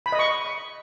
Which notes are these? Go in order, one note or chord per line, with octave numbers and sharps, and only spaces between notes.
B5
D#5
C#6